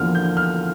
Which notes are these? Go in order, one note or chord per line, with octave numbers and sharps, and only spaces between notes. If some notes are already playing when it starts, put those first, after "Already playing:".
Already playing: E2 D3 F3 A#3 F6
G6
F6